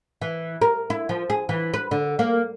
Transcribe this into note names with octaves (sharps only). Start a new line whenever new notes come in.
E3
A#4
E4
F3
G#4
E3
B4
D3
A#3